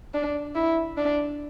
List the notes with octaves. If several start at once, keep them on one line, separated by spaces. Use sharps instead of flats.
D4
E4
D4